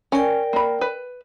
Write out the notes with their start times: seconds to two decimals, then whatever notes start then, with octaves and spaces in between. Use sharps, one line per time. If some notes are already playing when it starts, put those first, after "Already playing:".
0.12 C#4 A#4 D5 G5
0.53 A#3 B5
0.81 B4